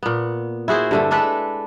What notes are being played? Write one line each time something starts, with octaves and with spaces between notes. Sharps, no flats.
A#2 B3
E4 F#4 G#4 C5
G2 D3 A3
G#3 D4 A4 B4